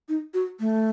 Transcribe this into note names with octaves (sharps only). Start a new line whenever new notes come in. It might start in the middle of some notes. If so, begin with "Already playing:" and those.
D#4
F#4
A3